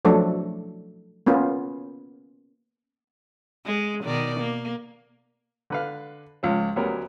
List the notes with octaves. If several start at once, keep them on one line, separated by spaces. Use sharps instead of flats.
F3 F#3 A3 D4 A4
A#3 B3 C#4 F4
G#3
B2 D#3 D5
A#3
D3 B4 F5
C#2 F3 C#4
D2 F#3 G3 B3 C#4 A#4